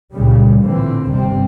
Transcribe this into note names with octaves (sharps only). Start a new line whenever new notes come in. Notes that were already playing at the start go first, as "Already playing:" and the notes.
C#2 A#2 C#3 G3
A1 A#2 D3 E3 C4
G1 D#2 C3 G3 C4